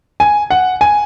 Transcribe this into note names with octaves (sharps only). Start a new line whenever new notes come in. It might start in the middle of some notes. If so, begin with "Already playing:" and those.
G#5
F#5
G#5